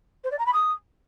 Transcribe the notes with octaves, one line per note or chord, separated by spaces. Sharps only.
C5
D5
A#5
B5
D#6